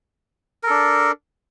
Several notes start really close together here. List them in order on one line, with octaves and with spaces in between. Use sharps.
A#4 A4 D4